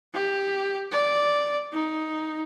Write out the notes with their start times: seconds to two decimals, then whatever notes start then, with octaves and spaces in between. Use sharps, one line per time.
0.14 G4
0.92 D5
1.72 D#4